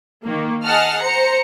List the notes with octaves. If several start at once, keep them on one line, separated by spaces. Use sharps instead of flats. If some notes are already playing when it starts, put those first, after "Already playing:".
D#3 A#3
G#4 D#5 F#5 A5 F6
C5 A#5 C#7